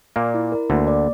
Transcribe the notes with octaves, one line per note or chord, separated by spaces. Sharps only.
A#2 A#3 D5
E4
A#4
D2 D3 A#3
D5